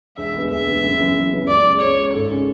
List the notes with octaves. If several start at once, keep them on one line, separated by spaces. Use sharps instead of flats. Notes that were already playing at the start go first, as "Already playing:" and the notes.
E1 E5
D2 D3 G#3 B3
E1 E5
D2 D3 G#3 B3
F#1
F#2 C#3 E3 B3
F#1
F#2 C#3 E3 B3
C#2 D5
C#3 G#3
C#2 C#5
C#3 G#3
G#1 A4
C#3 G#3 C#4